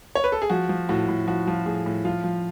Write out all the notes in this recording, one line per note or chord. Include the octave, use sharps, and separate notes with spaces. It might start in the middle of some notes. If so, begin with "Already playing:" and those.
C#5
B4
A4
G#4
F3 F#4
F3
A2 F#4
A2
F3 F#4
F3
A2 G#4
A2
F3 F4
F3